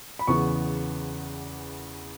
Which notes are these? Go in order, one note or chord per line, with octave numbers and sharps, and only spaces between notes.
B5
E2 C#3 E3 B3 C#6